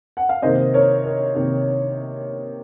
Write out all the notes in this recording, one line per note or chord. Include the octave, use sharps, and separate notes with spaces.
F#5
F5
C3 D#3 A#3 C5 D#5
A#4 C#5
A#4
C3 D#3 A#3